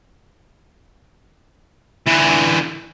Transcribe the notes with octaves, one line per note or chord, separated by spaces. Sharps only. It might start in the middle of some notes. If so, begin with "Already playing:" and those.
D3 E3